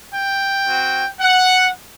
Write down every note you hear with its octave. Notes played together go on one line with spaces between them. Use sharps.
G5
C4 F#4
F#5